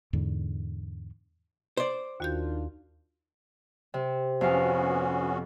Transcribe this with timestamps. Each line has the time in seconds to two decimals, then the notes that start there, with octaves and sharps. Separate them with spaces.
0.13 E2 G#2 D3
1.77 C5 D5
2.20 D#2 D#3 D4 F4 F#4 G6
3.94 C3
4.41 F2 B3 C#4 F#4 F5